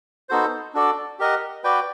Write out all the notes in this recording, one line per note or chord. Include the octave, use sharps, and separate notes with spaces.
B3 D#4 F#4 A4 C5
D4 F#4 A4 D5
G4 A#4 D#5 F#5
F#4 B4 D5 G5